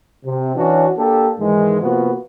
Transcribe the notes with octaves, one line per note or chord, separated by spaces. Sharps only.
C3
E3 C#4 D4 F#4
A#3 D4 G4 A4
G#2 D#3 E3 G#3
C3 F3 A#3 B3 F#4 B4